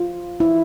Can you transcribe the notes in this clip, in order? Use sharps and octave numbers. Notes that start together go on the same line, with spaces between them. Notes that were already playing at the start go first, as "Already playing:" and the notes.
Already playing: F4
E4